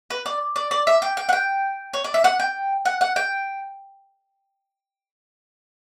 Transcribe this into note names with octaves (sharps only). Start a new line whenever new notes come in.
B4
D5
D5
D5
E5
G5
G5
F#5
G5
C#5
D5
E5
F#5
G5
F#5
F#5
G5